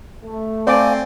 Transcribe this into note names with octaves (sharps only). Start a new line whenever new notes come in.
A3
C4 D5 F5 G#5 D6